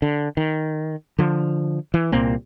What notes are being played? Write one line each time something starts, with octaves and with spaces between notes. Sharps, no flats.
D3
D#3
D3 F3
E3
C2 A#2 A#3 C4